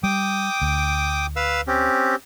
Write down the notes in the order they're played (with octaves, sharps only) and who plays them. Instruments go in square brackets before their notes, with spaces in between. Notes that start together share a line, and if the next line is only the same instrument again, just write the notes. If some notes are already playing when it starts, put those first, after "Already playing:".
[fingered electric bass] G3 [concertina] G5 D6 D#6
[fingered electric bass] D2
[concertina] B4 F5 E6
C4 C#4 G4